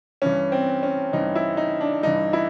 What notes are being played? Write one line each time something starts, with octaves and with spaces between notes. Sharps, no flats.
G2 E3 C#4
C4
C#4
G2 E3 D#4
E4
D#4
D4
G2 E3 D#4
E4